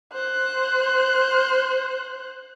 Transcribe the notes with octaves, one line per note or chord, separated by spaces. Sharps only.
C5 F#6